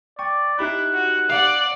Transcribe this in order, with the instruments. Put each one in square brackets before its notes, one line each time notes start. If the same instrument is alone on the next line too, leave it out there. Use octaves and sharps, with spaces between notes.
[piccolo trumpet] D5 [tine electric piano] G5 C#6
[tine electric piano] D#4 G4 B5 [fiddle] E4 [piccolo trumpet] F#6
[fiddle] F#4
[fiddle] D5 F#5 [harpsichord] F5